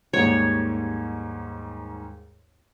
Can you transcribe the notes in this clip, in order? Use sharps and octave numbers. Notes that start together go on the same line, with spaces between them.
D#2 G#2 G3 C#5